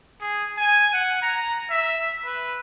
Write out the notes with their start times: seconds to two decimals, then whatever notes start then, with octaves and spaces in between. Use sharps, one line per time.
0.21 G#4
0.57 G#5
0.93 F#5
1.22 A#5
1.70 E5
2.25 B4